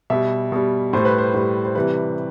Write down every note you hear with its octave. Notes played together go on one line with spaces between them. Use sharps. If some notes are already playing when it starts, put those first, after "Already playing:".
B2 G3 E5
B2 G3
A2 G3 C5
B4
C5
A2 G3
C5
C3 E3 G3 B4